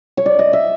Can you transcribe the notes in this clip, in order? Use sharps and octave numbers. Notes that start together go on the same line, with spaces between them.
C#5
D5
D#5
E5